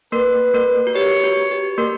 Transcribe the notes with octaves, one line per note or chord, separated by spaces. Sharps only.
A#3 A#4 B4
A#3 A#4
F#4
G4 C#5
F#4
G4
A#3 A#4